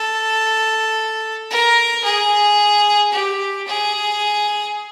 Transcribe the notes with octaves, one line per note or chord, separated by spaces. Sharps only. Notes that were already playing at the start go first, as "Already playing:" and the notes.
Already playing: A4
A#4
G#4
G4
G#4